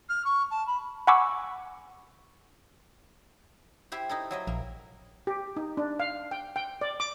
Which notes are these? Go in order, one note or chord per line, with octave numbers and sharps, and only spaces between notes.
F6
C#6
A5
B5
F#5 G#5 B5 C#6 D6 E6
E4 G4 C5
D#4 E4 A4
F#3 E4 D#5
A#1 A#3
G4
D#4
D4
F5
G5
G5
D5
D6